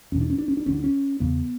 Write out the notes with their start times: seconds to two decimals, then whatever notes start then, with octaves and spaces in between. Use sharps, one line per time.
0.12 E2 B2 C#4
0.21 D4
0.30 C#4
0.38 D4
0.48 C#4
0.57 D4
0.66 D2 D3 C#4
0.75 D4
0.84 C#4
1.20 E2 C#3 B3